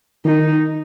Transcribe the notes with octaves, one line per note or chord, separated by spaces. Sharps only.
D#3 D#4